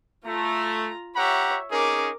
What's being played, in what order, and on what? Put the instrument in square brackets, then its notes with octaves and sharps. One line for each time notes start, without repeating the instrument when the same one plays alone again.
[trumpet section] A3 [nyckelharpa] F4 A#5
[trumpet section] G4 F#5 A#5 [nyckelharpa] C#5 E5
[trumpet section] C#4 D#4 G#4 [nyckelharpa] A#4 D6